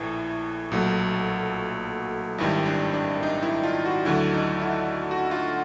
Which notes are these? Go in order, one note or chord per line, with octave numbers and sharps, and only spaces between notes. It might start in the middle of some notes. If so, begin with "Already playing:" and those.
Already playing: A#1 A2 E3
B1 A#2 F#3 A3
G#1 G2 D#3 G3 E4
D4
D4
D#4
E4
F4
F#4
D2 D3 F#3 A3 E4
D#4
E4
F#4
F4